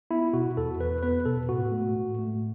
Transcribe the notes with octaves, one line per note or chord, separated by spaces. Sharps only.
B3 E4
B2 F#4
E2 A4
E2 B4
B3 B4
B2 A4
A2 F#4
A3
A2
A3